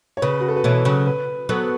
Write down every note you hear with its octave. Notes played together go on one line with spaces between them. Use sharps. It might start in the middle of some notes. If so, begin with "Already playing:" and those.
C#5
C#3 B4
F#4
A4
B4
B2 E3 C#5
C#3 F#3
B4
F#3 B3 A4